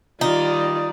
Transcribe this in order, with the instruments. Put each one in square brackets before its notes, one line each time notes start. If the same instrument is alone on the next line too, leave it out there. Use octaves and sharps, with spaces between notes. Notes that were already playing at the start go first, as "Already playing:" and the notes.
[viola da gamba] D#3 G3 [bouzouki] D#4 [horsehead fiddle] F4 [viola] D5